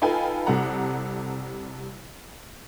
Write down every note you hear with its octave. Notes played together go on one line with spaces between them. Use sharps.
D#4 F4 A4 B4 G5 G#5
C2 C3 G3 A4 F#5 A#5